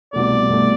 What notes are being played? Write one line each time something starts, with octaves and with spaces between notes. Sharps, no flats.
C2 B2 A3 D5
C2 B2 A3